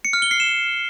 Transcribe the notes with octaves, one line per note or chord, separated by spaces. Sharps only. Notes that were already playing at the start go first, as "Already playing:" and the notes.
C#7
F6
G7
C7
E7